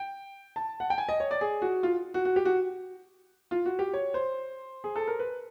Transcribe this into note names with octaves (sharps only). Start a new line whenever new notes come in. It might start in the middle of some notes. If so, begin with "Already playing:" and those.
Already playing: G5
A5
F#5
G5
G#5
D#5
C#5
D5
G#4
F#4
F4
F#4
F#4
G4
F#4
F4
F#4
G4
C#5
C5
G#4
A4
A#4
B4